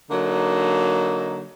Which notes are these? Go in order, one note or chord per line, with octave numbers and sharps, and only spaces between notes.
D3 F#3 A#3 D#4